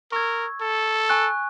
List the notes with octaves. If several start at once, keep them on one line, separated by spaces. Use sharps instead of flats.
A#4 C#6 E6 G#6
A4
G#5 C#6 F#6